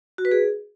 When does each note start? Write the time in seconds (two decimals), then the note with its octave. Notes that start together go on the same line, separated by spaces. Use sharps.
0.18 F#4
0.25 B4
0.31 G#4